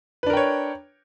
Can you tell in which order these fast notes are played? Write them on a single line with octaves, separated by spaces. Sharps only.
B4 D4 A#4 G5 C#5